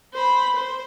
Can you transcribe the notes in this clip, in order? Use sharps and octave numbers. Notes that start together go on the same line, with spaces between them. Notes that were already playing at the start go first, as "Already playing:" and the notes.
C5 B5
C5